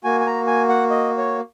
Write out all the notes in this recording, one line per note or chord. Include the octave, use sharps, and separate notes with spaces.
A#3 F#4 G#5
G#5
A#5
G#5
F#5
D#5
C#5